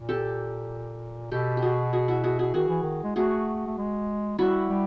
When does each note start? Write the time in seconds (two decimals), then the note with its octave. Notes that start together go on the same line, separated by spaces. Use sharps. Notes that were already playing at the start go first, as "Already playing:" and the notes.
Already playing: A#2
0.09 G4 A4
1.31 B2 G4 A4
1.57 G4
1.62 F#4 G#4
1.93 F#4 G#4
2.08 E4 F#4
2.24 F#4 G#4
2.39 F#4 G#4
2.54 D#3 F#4 G#4
2.69 E3
2.83 D#3
3.04 G#3
3.16 A3 F#4 G#4
3.67 A3
3.78 G#3
4.39 G3 E4 F#4
4.70 G3